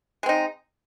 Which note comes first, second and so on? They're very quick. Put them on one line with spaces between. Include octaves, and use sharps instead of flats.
G#3 C4 D#4